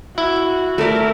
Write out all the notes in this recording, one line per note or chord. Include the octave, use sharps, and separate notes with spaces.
E4 F#4
A3 A#4 D5 E5